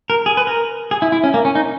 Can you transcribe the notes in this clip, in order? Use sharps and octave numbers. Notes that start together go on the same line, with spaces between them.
A#4
G#4
B4
A#4
G#4
E4
E4
C#4
A#3
C#4
D#4